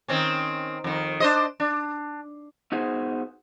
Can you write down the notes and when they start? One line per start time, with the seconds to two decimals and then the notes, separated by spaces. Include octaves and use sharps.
0.08 D#3 C4 C#4
0.84 F2 D#3
1.20 D4 C5 D#5
1.60 D4
2.72 B3 D#4 F#4 G#4 C5